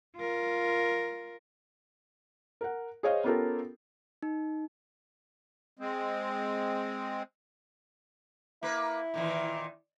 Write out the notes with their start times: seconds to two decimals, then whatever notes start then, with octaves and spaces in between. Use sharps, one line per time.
0.17 F4 A#4
2.61 A#4 F#5
3.03 G#4 C5 C#5 D#5 F5
3.24 B3 C#4 F4 G4 A4 A#4
4.23 D#4
5.79 G#3 C4
8.63 A#3 E4 B4
9.14 A#2 D#3 E3